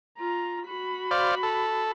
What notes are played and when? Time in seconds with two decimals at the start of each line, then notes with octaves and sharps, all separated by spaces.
0.19 F4 A#5
0.67 F#4 B5
1.11 C5 D5 F5
1.43 A4